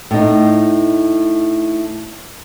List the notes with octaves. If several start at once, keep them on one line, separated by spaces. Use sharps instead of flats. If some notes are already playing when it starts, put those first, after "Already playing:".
A2 D#4